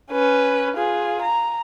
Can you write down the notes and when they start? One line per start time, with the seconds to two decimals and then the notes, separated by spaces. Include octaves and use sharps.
0.12 C#4 B4
0.77 F4 G#4
1.21 A#5